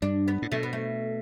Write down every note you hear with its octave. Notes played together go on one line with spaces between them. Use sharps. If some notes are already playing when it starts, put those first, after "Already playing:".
G2 D4
B3
A2
B2 A3
B3
A3